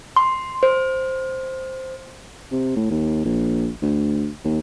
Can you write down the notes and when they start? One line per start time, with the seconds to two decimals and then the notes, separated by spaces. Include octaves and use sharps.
0.16 C6
0.63 C5
2.51 C3
2.76 A2
2.91 D#2
3.25 A#1
3.82 D2
4.44 D#2